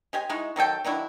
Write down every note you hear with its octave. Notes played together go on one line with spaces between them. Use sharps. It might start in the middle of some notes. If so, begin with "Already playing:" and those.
G#3 G4 G#5
G#3 D#4 E4 F#4
D#3 F#3 A4 G5
D#3 F#3 D4 E4